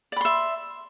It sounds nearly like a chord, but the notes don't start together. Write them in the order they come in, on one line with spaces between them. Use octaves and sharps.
D5 B5 C6 E5